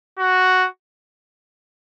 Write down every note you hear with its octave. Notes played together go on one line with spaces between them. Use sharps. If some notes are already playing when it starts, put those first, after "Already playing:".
F#4